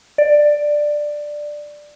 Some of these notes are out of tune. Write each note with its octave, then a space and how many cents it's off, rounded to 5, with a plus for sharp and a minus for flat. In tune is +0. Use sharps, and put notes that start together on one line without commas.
D5 +10